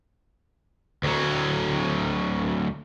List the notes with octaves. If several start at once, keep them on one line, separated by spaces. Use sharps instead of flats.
D2 F#3